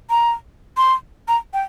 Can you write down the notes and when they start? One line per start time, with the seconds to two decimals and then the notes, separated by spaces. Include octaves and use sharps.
0.10 A#5
0.77 C6
1.28 A#5
1.54 G5